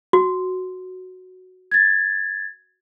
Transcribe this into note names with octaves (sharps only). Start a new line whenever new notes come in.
F#4
G#6 A6